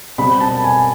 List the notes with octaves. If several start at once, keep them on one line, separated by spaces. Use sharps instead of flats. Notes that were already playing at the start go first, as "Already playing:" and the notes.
B2 G3 C4 B5
A5
G#5